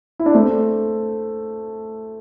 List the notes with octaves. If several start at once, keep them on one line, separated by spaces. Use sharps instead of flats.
E4
D4
A3 C4